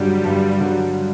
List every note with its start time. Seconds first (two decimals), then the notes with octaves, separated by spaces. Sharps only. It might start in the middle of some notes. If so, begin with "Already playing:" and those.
Already playing: G2 D3 F#3 G3
0.24 G2
0.60 D3 F#3